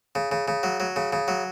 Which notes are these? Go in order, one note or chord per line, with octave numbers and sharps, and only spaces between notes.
C#3
C#3
C#3
F#3
F#3
C#3
C#3
F#3